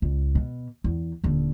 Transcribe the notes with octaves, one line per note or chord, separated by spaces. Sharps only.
C#2
B2
E2
D#1 D3